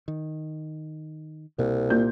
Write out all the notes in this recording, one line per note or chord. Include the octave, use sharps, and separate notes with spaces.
D#3
C2 B2 A#3
A#2 G6